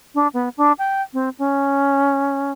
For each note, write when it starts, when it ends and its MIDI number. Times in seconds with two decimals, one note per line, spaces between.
0.15 0.28 62
0.34 0.49 59
0.57 0.72 62
0.79 1.02 79
1.13 1.29 60
1.39 2.52 61